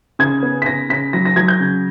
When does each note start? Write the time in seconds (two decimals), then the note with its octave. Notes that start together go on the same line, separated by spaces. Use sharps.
0.19 C#3 G#6
0.43 B3
0.62 B6
0.66 C#3 A#6
0.90 C#3 B6
1.13 F#3 A#6
1.25 A#6
1.36 F#3 G#6
1.48 G6
1.60 C#3